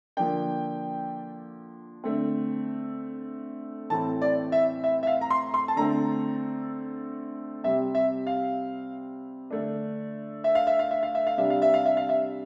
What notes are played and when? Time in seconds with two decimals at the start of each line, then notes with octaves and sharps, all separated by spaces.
0.17 D3 F3 A#3 D4 G5
2.04 D3 A3 C4
3.90 A2 E3 A3 C4 A5
4.22 D5
4.52 E5
4.84 E5
5.03 E5
5.07 F5
5.21 A#5
5.30 C6
5.54 C6
5.68 A5
5.76 D3 A3 C4 A#5
7.64 C3 G3 C4 E5
7.95 E5
8.27 F5
9.51 D3 A3 D4
10.44 E5
10.55 F5
10.67 E5
10.79 F5
10.91 E5
11.03 F5
11.15 E5
11.27 F5
11.37 C3 G3 D4 E5
11.50 F5
11.62 E5
11.74 F5
11.86 E5
11.97 F5
12.09 E5